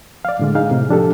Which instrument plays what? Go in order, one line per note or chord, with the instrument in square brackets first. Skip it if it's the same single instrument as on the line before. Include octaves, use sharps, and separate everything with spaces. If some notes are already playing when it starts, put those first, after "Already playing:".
[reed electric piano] D5 F5
A2 D3 G#3
D#4 G#4 F5
A2 C3
F3 D4 G4 A4